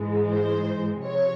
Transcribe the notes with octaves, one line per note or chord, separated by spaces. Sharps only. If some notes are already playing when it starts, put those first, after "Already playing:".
Already playing: G#2 E3 G#3
C5
C3 F3 C#5